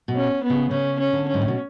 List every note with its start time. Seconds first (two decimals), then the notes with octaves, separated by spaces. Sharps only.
0.08 B2
0.16 C#4
0.44 B3
0.50 C#3
0.71 C#3 C#4
1.00 C#4
1.13 D3
1.28 C#4
1.34 G#2
1.41 A2
1.48 B2